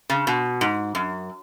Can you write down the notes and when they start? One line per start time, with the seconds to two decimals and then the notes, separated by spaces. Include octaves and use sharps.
0.10 C#3
0.27 B2
0.61 G#2
0.95 F#2